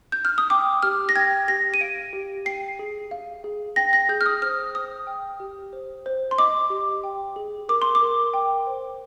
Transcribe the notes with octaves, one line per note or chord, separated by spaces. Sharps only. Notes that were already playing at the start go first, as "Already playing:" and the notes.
G6
F6
D#6
G5 D6
G4 F6
A#6
G5 G#6
G4 A#6
D#7
F5 D7
G4
G5 C7
G#4
F5
G#4
G5 A#6
A#6
G#4 G6
F6
D#6
C5 F6
C5 D#6
G5
G4
C5
C5
C6
D#5 D6
G4
G5
G#4
A#4 D6
C6
D6
A#4
G5
C5